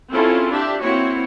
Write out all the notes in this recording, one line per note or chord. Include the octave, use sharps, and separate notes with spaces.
C4 C#4 E4 F4 G#4 A4
D4 G4 E5
A#3 C4 E4 F#4 C#5